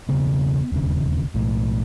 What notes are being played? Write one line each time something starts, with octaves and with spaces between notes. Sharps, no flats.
E1 D#2 C#3 B3
E1 D#2 C#3
B1 A2